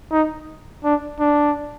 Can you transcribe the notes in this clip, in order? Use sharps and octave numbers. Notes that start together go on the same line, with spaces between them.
D#4
D4
D4